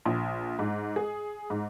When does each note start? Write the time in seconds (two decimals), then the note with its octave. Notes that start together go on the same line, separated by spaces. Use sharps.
0.05 A#1
0.59 G#2
0.96 G#4
1.50 G#2